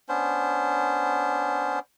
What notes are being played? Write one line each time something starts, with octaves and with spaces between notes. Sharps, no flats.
B3 C#4 D4 C5